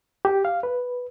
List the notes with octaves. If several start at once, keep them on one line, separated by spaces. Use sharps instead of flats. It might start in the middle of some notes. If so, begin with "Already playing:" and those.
G4
F5
B4